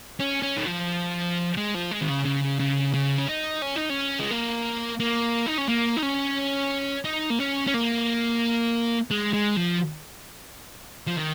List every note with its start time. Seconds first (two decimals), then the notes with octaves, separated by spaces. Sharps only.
0.20 C#4
0.42 C#4
0.57 D#3
0.66 F3
1.57 G#3
1.74 F3
1.91 G#3
2.01 D#3
2.09 C#3
2.25 C#3
2.59 C#3
2.93 C#3
3.19 C#4
3.29 D#4
3.62 C#4
3.76 D#4
3.90 C#4
4.20 G#3
4.31 A#3
5.00 A#3
5.46 D#4
5.58 C#4
5.68 A#3
5.97 D#4
6.03 C#4
7.05 D#4
7.30 A#3
7.40 C#4
7.67 C#4
7.74 A#3
9.11 G#3
9.33 G#3
9.57 F3
11.07 F3
11.16 D#3